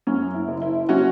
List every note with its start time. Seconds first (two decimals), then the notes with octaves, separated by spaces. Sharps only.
0.07 F#2 C#4
0.34 E4
0.48 F#1
0.62 E4
0.89 F#3 C#4 F#4